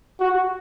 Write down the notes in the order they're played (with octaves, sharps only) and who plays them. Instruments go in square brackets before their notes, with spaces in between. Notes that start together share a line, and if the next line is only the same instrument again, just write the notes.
[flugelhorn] F#4